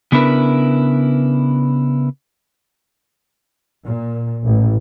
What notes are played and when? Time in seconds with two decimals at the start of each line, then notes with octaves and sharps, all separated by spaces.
0.12 C#3 B3 D4 E4 A#4 B4
3.85 A#2
4.45 A1